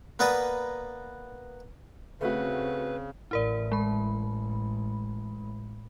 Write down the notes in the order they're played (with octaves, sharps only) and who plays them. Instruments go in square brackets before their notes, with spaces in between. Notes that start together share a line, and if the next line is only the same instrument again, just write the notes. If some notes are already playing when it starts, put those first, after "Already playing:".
[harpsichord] A#3 B3 B4 D5 A#5 D#6
[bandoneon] C#3 [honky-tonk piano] A3 F#4 [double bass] C4 [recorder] B4
[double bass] A1 [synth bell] E4 A#4 D5
[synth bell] G#3 B5